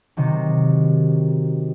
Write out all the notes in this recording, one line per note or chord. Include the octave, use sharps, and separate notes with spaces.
C3 D#3 F#3